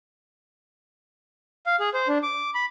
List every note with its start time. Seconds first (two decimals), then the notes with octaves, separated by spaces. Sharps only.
1.66 F5
1.80 G#4
1.94 C5
2.08 D4
2.23 D6
2.55 B5